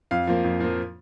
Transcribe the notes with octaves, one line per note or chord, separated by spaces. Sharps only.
F2 F5
F3 A#3
F2
F3 A#3